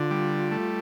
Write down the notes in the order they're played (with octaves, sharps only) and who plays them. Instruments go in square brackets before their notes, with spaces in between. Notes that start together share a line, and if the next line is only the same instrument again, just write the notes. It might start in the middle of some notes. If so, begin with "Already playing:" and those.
Already playing: [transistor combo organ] D3 [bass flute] F4
[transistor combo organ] G3
A3